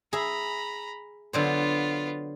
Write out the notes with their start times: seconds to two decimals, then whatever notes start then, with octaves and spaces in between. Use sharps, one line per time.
0.13 G#4 E5 A#5 B5
1.33 D3 F#3 B3 F4 C5